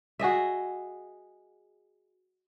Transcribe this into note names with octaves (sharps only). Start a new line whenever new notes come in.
F#4 G#4 D#5 E5